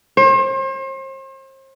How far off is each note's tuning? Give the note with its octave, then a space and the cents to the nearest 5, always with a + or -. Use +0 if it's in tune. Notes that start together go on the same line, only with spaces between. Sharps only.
C5 +40